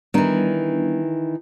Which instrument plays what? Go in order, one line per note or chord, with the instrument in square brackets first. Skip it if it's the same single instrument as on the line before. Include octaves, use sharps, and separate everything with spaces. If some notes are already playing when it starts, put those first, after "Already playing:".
[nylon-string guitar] D#3 E3 [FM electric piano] G3 B3 D4